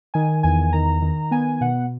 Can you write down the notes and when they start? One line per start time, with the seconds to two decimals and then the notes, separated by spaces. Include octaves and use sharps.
0.14 D#3 G#5
0.43 E2 G#5
0.73 D#3 A#5
1.02 D#3
1.31 B3 G#5
1.61 B2 F#5